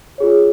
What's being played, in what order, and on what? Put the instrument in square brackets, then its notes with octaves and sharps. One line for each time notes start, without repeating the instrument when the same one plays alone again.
[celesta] F4 G#4 C#5